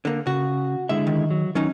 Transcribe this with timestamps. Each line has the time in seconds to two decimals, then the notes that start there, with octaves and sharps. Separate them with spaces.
0.05 D3 A#3
0.27 C#3 F#4
0.89 D3 G#3 E4 E5
1.07 D#3
1.31 F#3
1.55 D#3 F#3 C#4 D#4